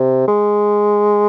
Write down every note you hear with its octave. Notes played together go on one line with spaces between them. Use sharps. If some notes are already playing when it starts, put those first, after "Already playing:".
Already playing: C3
G#3